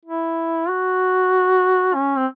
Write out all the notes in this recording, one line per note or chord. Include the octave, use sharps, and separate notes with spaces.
E4
F#4
C#4
C4